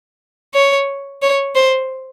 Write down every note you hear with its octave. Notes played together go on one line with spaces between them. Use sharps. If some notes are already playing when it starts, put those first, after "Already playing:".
C#5
C#5
C5